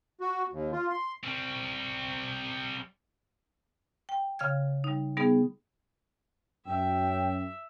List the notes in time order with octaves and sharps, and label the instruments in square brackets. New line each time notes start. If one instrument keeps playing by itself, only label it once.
[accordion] F#4
D#2
F4
C6
[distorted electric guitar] G3 C4
[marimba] G5
C#3 F5 F6 G#6
G3 D#4
G3 B3 D#4 G#4
[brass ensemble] F#2 [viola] E5 [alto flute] G5